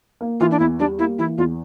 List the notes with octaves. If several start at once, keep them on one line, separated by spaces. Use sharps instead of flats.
A#3
E3 F4
D4
E2 E4
G3 D4
A#3 E4
E3 E4
E2 F4